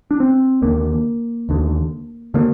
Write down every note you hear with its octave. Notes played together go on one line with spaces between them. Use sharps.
D4
C4
D#2 D3 A#3
D#2 D3
D3 A#3